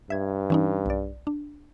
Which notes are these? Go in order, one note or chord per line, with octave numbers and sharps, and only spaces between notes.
G2 E5 G#6
E3 C#4 D#4
B1 D5
D4